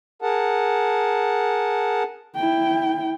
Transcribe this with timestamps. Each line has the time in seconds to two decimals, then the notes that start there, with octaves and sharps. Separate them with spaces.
0.22 G#4 A#4 F#5 A5
2.36 E4 G5